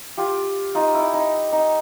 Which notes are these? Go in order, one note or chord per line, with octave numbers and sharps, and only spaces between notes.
F4 G4
D#4 F4
E4
D#4
D#4